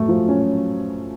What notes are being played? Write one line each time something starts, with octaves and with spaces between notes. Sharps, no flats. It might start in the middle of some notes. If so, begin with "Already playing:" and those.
Already playing: F#2 A3
F3
C#4